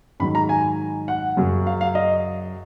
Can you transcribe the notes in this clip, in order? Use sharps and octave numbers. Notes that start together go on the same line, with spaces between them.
G#2 D#3 F#3 B5
A#5
G#5
F#5
F#2 C#3 F#3
F5
F5
D#5